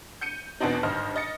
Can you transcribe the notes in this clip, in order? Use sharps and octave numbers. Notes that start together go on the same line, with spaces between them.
G6 C#7 D#7
E2 B2 B3 C4 D4 D#4
G#1 G2 D3 C5 D#5 F6
D#5 A6 C#7